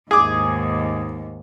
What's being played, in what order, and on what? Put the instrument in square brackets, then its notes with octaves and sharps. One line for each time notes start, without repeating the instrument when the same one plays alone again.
[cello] D#2 G#2 [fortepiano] G#4 D6